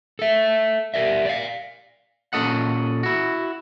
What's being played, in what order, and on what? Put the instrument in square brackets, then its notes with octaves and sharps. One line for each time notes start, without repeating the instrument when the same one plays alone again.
[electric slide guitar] A4 E5
G4 A#4 D5 E5
D5 F5
[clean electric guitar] A#2 C#4 A4 D#5 F#5
E4 F#4